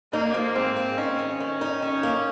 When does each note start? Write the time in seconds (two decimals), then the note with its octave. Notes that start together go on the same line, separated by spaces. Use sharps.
0.13 A#3 D#4
0.34 F3
0.56 G#2 C4
0.76 A#3
0.97 C#4 D#4
1.19 D#3
1.40 D#3
1.61 D#4
1.82 D#3 C#4
2.03 A#3